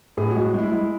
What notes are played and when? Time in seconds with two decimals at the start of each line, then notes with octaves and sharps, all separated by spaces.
0.17 A2 G#4
0.31 F#4
0.36 G#3
0.54 G#3 E4
0.72 G#3 E4